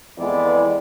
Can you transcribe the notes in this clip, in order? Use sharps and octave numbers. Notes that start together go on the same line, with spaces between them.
F2 E3 G#3 B3 D5